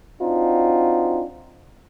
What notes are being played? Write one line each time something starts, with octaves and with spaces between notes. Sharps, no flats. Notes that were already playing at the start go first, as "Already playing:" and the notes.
C4 D4 D#4 F4 F#4